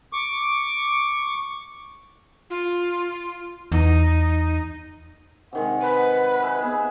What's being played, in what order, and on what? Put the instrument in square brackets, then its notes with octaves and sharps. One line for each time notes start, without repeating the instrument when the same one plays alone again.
[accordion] C#6 D6
[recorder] F4
[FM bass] E2 [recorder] D#4
[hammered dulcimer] C3 D#3 G#3 [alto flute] F#5
[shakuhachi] B4
[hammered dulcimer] G#4 E5
[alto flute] B3 [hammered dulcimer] G#4